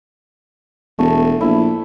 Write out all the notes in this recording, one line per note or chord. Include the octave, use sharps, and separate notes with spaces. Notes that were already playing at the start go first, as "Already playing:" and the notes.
E1 A3
A#1 E4